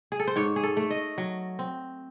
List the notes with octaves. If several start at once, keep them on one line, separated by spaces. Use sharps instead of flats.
G#4
A4
C5
G#2 C#5
G#4
A4
A3
D#5
F#3
C4